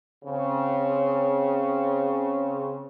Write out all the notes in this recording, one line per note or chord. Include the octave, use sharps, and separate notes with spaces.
C#3 C4